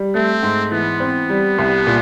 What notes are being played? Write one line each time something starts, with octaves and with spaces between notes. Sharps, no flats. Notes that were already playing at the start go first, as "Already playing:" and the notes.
Already playing: G3
A3 C4
G#2
E3 B3
C4
G3
C2
A#2